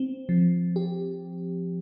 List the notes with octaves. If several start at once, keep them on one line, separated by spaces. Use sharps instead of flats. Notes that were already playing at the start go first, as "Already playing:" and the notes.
Already playing: C4
F3
G4